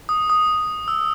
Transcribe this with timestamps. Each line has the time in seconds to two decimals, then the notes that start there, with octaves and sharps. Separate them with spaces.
0.09 D#6
0.30 D#6
0.88 E6